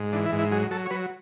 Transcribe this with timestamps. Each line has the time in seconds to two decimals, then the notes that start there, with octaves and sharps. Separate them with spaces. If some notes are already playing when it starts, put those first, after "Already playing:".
Already playing: G#2
0.12 E3 D4
0.26 E4
0.32 G#2
0.39 E4
0.52 F#3 G#4
0.71 F#3 A4
0.86 C#5
0.91 F#3 B4